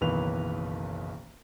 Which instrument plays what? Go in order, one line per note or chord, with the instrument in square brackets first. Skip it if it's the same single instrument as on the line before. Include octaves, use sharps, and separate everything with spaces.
[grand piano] F#1 B1 D#3 E3 B4 F7